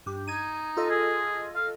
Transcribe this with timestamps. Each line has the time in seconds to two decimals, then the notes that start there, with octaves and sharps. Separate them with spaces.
0.06 G2 G4
0.28 D#4 G#6 D#7
0.77 F4 A4 D#5
0.90 G#4
1.55 F5